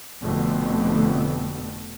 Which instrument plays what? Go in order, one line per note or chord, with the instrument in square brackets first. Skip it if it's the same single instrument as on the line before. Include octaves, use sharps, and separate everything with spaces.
[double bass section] F1 F2 B2 D3 A3